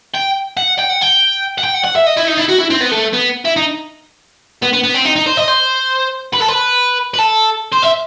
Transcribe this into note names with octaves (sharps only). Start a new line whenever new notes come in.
G5
F#5
G5
F#5
G5
F#5
G5
F#5
F#5
E5
D#5
E4
D#4
E4
F#4
E4
C4
B3
A3
B3
E4
D#4
B3
B3
B3
C4
D#4
D#4
C5
D#5
C5
B4
A4
B4
B4
A4
C5
E5